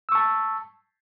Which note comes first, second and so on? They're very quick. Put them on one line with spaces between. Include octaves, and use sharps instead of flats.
E6 C#6 A5